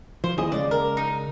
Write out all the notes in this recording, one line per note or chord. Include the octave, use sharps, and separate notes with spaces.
F3 C5
D#2 E4 G#4 D#5
C#3 G#3 D5
A#4
D#4